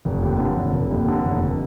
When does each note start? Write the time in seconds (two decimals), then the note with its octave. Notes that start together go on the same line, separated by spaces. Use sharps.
0.05 F1
0.22 D#2
0.40 D3
0.57 F1
0.74 F1
0.91 D#2
1.08 D3
1.25 F1